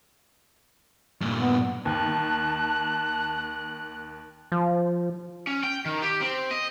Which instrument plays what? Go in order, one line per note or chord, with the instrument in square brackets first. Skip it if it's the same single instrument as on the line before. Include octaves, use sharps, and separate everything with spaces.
[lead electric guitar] G2 A#2
[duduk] B3
[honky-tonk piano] D#2 [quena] A5 [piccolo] F#6
[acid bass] F3
[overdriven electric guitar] C#4
G5
D#3
G4
C4
D#5